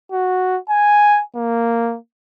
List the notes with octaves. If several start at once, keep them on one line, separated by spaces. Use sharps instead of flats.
F#4
G#5
A#3